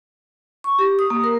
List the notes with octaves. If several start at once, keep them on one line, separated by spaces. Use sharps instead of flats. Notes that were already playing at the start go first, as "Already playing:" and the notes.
C#6
G4
D#6
A#3
A#4